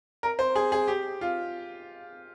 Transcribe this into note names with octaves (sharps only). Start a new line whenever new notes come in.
A#4
C5
G#4
G#4
G4
F4